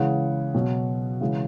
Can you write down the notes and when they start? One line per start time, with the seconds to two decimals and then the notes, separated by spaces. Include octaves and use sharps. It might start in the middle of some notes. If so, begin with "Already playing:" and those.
Already playing: C#3 E3 G#3 F#5
0.54 B2 F#3
1.21 C#3 E3 G#3